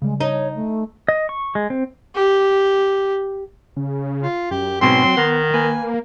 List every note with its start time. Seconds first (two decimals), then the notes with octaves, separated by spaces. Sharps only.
0.02 C#3 G3 G#3
0.21 D#4 C#5
0.55 A3
1.08 D#5
1.29 C#6
1.55 G#3
1.70 C4
2.15 G4
3.76 C#3
4.23 F4
4.51 F#2 G4
4.81 G#2 B2 F#3 C4 C#4 C6
5.17 D#3 B3 F#5
5.54 A#3 B4 G#5